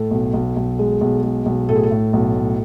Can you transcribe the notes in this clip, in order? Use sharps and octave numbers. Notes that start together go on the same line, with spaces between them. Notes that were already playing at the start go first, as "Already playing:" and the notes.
Already playing: A2 A4
B1
B1
B1
G#3
B1
G#3
B1
A2 A4
G#4
A4
A2
B1
A2